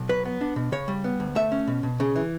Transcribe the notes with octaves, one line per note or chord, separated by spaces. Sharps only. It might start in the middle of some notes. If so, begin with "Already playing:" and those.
Already playing: B1
F#3 B4
B3
D4
B2
C#3 C#5
G3
B3
D2
A3 E5
C#4
B2
B2
C#3
E3